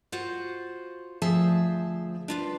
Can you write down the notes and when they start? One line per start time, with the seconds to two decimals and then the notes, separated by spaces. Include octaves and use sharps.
0.12 F4 F#4 C5 F#5
1.22 D2 F3 G#4 C5 E5 A5
2.28 D4 F4 B4